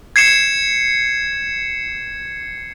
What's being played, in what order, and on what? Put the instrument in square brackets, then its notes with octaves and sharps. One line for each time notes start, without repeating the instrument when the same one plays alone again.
[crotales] G#6 C7 C#7 E7